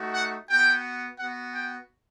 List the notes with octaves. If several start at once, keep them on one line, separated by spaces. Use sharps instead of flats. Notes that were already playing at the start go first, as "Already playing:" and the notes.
Already playing: A3 D#4 F#4
F#5
B3 F#4 G5
B3 F#4 F#5
G5